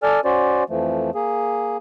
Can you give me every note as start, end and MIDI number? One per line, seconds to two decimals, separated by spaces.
0.03 0.20 69
0.03 0.20 74
0.03 0.20 80
0.03 0.20 89
0.25 0.64 61
0.25 0.64 66
0.25 0.64 72
0.25 0.64 74
0.70 1.11 41
0.70 1.11 52
0.70 1.11 53
0.70 1.11 57
1.15 1.77 58
1.15 1.77 68